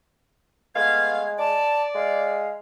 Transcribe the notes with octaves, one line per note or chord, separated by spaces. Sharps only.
G#3 A3 B3 F5 G#6
D5 A5
G#3 F5